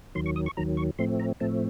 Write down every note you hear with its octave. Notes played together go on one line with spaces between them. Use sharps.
D#2 D#3 F#3 C6
C#6
D#6
C#6
D#2 D#3 F#3 A#5
C#6
A2 F3 A3 C4 C6
A#5
A2 F3 A3 C4 A5